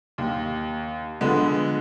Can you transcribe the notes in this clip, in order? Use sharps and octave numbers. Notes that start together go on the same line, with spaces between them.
D#2
D3 F3 G#3 B3